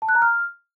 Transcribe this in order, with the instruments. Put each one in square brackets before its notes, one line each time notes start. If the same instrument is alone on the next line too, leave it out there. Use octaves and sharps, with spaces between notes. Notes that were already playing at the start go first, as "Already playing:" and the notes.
[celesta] A5
F#6
A#5
F6